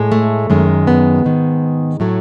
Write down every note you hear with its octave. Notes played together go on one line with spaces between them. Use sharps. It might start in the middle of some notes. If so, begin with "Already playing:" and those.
Already playing: A2 G#3
A3
F#2 D#3 G#3
B3
G#2 D#3 G#3
A2 F#3 A3